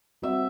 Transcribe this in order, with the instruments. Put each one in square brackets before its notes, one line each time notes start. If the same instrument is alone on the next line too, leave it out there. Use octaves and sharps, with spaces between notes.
[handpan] G3 C4 F#4 [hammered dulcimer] E5